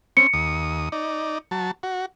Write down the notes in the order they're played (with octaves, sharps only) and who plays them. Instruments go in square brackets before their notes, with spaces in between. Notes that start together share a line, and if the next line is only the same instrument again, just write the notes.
[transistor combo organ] C4 C#4 [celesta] C#7
[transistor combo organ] D#2 D#6
D#4 D5
F#3 A5
F#4